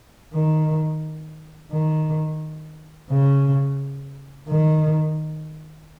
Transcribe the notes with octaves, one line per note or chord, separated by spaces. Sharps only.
D#3
D#3
C#3
D#3